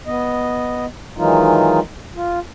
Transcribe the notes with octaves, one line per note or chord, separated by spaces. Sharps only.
B3 D#5
D#3 E3 F#3 G#3 D#4 F4
F4